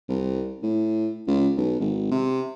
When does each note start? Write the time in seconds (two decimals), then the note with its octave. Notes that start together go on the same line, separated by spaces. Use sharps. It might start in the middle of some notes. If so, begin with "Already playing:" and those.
0.09 C2
0.63 A2
1.27 C#2
1.57 B1
1.80 G#1
2.11 C3